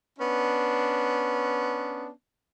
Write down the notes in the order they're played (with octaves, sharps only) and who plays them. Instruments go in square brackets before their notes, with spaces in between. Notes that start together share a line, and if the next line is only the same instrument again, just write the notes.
[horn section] B3 C#4 D4